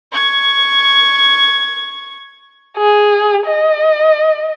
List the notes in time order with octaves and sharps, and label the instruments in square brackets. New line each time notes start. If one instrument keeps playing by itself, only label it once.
[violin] C#6 G#6
[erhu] G#4
D#5